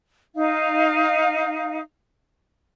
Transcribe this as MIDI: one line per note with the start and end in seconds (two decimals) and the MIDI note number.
0.35 1.80 63
0.35 1.80 77